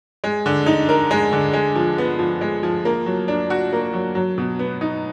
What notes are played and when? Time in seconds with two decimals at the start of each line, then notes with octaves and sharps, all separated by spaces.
0.24 G#3
0.46 D3
0.66 D#4
0.89 A#4
1.11 G#3
1.33 D3
1.53 G#3
1.75 F3
1.98 B3
2.19 F3
2.41 G#3
2.63 F3
2.85 A#3
3.06 F#3
3.28 D4
3.50 F#4
3.73 A#3
3.93 F#3
4.15 F#3
4.38 B2
4.59 B3
4.81 D#4